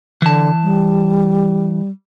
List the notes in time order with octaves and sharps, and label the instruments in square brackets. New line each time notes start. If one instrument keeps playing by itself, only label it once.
[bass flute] D3 [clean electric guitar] E3 A5
[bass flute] G3